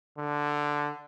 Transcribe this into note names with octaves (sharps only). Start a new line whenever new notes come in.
D3